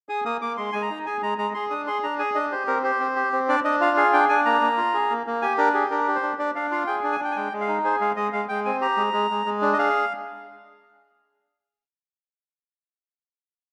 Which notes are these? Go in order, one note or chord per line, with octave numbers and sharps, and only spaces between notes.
G#4 D#6
A#3 D#6
A#3 D6
G#3 C6
G#3 G#5
A#5
D#4
G#4 G#5
G#3 A#5
G#3 A#5
G#4 C6
D4 D#6
G#4 C6
D4 A#5
G#4 G#5
D4 D#5
G4 C5
C4 A#4
G4 C5
C4
G4
C4
D4 D5
D4 D#5
F4 F5
G#4 F5
D4 G5
D4 G#5
A#3 A#5
A#3
F4
G#4
A#3
A#3
G4 G#5
D4 A#4
G4 G#4
D4 A#4
G4
C5
D4
D4 D5
D4 F5
F4 F5
G#4 G5
D4
G#5
D4 G5
G#5
G#3 G5
G#3
F5
D#4
G#4 C5
G#3 F5
G#3 D#5
G#3 F5
G#3 G5
C4 G#5
G4 A#5
G#3
G#3
G#3
G#3
D4
D#5
G#4 F5